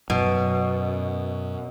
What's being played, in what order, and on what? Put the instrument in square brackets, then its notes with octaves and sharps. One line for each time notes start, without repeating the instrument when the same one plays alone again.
[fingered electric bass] F#2 [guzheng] B2